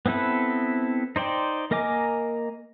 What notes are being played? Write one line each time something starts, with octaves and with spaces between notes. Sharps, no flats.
B3 C4 E4 A4 B4
D#4 C5 D5 G5
A#3 A#4 D#5 G#5 D6